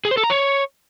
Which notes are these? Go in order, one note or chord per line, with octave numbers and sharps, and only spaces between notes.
G#4
C5
A4
A#5
C#5